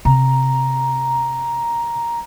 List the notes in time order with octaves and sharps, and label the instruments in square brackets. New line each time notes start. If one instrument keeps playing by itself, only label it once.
[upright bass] C3 [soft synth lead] A#5